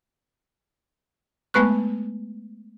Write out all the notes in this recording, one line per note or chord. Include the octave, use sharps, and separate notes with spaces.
G#3 A3 B3 B4 C#6 F#6